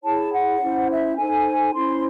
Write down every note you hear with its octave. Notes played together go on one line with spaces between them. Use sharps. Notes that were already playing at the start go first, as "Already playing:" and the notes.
E4 G#4 C#5 A5
F#5
C#4 E4 C5
E5
D#4 A4 C5 G#5
C#4 E4 C5 C6